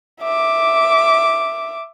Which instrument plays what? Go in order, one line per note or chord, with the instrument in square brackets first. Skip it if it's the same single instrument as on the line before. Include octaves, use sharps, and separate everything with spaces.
[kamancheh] E5 D6